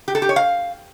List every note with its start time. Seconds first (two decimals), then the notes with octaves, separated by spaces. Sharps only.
0.08 G4
0.15 A4
0.22 G4
0.29 C#5
0.36 F5